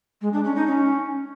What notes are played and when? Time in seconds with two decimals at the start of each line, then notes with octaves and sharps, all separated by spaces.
0.22 G#3
0.33 D4
0.44 C#4
0.55 D#4
0.67 C#4